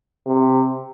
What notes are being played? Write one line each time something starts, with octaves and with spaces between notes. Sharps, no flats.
C3